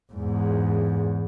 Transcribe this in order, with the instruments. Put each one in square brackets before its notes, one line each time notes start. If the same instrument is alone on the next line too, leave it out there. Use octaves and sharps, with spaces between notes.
[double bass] E2 G#2